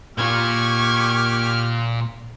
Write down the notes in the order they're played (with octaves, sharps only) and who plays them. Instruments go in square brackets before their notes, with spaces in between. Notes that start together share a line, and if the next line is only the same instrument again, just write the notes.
[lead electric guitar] A#2 F4 [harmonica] G4 F6 [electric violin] C#6 G#6